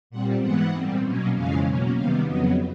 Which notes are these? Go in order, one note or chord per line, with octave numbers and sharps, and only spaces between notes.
A#2 G3 C4 F#5
G#2 E3 G#3 B3 F#5
A#2 G3 C4
B2 F#3 A#3 C#4
F2 C#3 E3 G#3 C#4 F5
B2 F#3 A#3 C#4
C3 D#3 G3 B3 F5
F2 C#3 F#3 B3 D#5